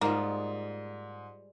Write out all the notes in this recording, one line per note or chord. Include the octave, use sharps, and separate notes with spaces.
G#2 G3 G#3 A#3 F4